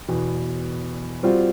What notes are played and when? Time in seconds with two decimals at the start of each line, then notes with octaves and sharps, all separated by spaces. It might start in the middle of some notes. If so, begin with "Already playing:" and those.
0.08 E2 B2
1.23 G3 C4 F4 F#4